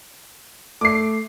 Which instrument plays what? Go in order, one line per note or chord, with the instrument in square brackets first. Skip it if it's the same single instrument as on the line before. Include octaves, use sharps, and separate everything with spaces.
[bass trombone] A3 [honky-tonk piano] D6 C7